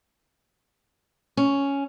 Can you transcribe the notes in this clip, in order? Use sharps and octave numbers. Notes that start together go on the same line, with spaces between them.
C#4